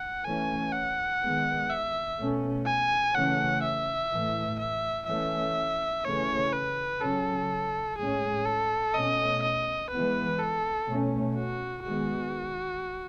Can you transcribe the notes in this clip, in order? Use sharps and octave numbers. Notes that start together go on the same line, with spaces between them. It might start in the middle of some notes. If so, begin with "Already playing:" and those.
Already playing: F#5
E3 A3 C#4 G#5
F#5
D#3 G#3 B3
E5
B2 A3 C#4
G#5
C#3 E3 A3 C#4 F#5
E5
A2 E3 A3
E5
E3 A3 C#4 E5
C#3 E3 A3 C#4 C#5
B4
C#3 F#3 C#4 A4
A2 G#3 C#4 G#4
A4
B2 A3 C#4 D#5
D#5
E3 G#3 B3 B4
A4
B2 A3 C#4
F#4
D#3 G#3 B3 F#4